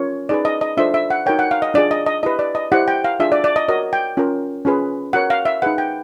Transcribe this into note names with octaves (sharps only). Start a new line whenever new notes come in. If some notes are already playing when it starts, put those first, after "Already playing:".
Already playing: C#4 F4 A#4 C#5
D#4 G#4 B4 D5
D#5
D#5
D4 F4 A4 C5 E5
E5
F#5
D#4 F#4 A#4 C#5 G5
F#5
F5
D#5
D4 F4 G#4 D5
D#5
D#5
E4 G4 B4 D#5
D5
D#5
E4 G4 C5 F#5
G5
F5
D4 F4 G#4 E5
D5
D5
D#5
F#4 A#4 C#5 D#5
G5
C#4 F4 A#4
C#4 F4 G#4 B4
F#4 A#4 C#5 F#5
F5
E5
D#4 G#4 B4 F#5
G5